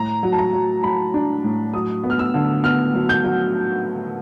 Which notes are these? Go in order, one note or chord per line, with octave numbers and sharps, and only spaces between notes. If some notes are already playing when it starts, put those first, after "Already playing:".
Already playing: A2 A#5
F#3
A5
A#5
F#3
F#3 B5
D4
A2
F#3 D#6
B3
F6
E6
D3
B3 F6
F#3
G6
F#3